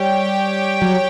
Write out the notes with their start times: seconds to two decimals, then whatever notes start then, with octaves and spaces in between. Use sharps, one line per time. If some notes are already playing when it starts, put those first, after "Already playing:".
Already playing: G3 G4 C#5 G5
0.82 F#3